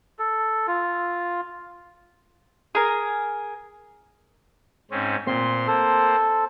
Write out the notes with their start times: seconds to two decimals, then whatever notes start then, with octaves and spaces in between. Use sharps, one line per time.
0.19 A4
0.68 F4
2.75 G#4 A#4
4.91 G#2 C4 C#4
5.27 A#2 C4 C6
5.67 A#3 A4 C5